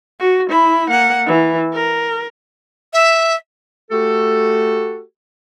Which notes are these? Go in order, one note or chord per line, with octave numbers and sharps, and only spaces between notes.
F#4
E4 B5
A#3 F#5
E3
A#4
E5
A3 F#4 G4 A4